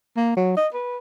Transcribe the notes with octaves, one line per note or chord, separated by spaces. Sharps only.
A#3
F#3
D#5
B4